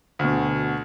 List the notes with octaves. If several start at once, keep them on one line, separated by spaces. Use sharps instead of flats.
D2 B2